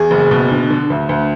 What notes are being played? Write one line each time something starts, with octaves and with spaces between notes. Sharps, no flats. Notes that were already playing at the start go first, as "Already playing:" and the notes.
Already playing: E2 G#4
F#1
B2
D3
D3
D2
D2